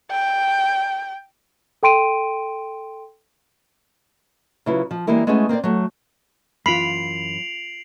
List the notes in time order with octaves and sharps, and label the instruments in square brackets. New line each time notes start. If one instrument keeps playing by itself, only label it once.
[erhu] G5
[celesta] A4 G5 C6 D7 D#7
[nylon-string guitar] C#3 F#3 E4 F4 B4
F3
E3 G3 G#3 A#3 E4 A#4
G#3 A3 B3 C#4 E4 G#4
A#3 C4 A#4 D5
F#3 A3
[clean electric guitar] F#2 E3 [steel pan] F4 B5 [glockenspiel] C7 [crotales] D7 F7 F#7